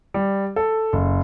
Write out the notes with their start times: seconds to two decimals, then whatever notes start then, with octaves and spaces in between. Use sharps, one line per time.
0.14 G3
0.56 A4
0.93 F#1